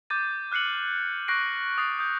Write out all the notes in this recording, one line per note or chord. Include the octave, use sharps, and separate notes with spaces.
D6 G6 A6 D#7
F6 F#6 C7 C#7 F#7
C#6 F#6 A#6 C7 D7
D#6 A6 C7
D#6 G6